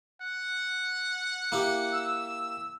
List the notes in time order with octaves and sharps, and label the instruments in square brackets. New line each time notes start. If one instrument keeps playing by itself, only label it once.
[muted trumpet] F#5
[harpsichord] A#3 E4 G4
[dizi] E6